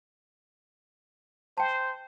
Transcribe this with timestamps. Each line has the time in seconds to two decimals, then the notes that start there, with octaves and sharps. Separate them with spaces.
1.57 C5 G5 A5